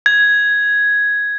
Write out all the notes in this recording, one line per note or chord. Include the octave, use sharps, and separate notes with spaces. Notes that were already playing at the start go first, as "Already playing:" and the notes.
G#6